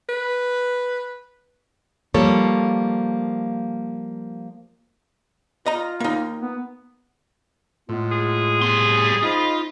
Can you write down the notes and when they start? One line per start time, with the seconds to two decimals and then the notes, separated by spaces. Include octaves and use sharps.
0.09 B4
2.14 F3 G3 A#3 A4 C#5
5.66 F4 D#5 A#5
6.00 A#3 D#4
6.41 B3
7.89 A2 G#3 B3 F4
8.12 G#4
8.62 G3 B3 C6
9.23 D#4 F4 C5 D#5 B5